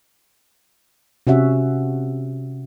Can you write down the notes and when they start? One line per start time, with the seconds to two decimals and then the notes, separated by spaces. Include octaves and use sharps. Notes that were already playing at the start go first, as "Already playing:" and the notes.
1.27 C3 C#4 F#4 E5 F#5